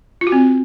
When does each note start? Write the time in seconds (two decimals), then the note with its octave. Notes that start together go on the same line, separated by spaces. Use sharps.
0.21 F4
0.27 F#4
0.32 C4